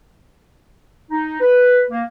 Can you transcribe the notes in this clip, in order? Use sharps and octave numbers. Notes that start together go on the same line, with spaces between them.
D#4
B4
A#3